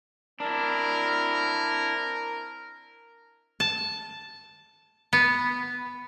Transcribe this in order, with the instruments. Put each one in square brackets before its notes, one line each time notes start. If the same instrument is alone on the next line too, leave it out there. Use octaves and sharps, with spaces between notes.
[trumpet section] C4 A#4 [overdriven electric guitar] D4 E4
[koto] A5
B3